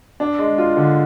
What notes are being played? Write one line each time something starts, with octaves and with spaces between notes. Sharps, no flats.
D4
G#3
F4
D3